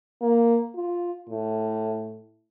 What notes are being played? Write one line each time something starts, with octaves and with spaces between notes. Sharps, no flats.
A#3
F4
A2